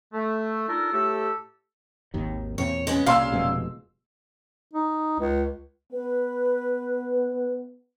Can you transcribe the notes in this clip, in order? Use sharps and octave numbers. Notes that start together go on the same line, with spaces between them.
A3
D4 D#4 F4 A4 A#4
A2 A3 G4 A4
G#1 D#2 D#3
E2 A#2 C4 C#5
G#3 B3 C#4
C2 A#2 C#3 F5 C6 E6
F1 B2 G#3
D#4
C#2
B3 B4